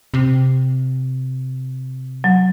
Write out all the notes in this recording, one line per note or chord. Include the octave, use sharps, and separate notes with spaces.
C3
F#3